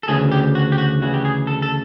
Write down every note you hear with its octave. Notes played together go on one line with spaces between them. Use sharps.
A4
D2 C#3 E3 G#4
G4
F#4
G4
F#4
D2 C#3 E3 F#4
G4
G#4
A4
A4